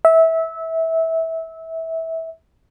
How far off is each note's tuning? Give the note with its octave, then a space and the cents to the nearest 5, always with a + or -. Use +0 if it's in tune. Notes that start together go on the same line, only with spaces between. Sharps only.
E5 -20